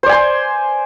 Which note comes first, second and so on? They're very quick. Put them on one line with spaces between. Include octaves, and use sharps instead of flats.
C5 D5 G#5 C6